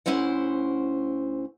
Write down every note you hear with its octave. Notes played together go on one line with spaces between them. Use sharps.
D2 C#4 E4 C5 F#5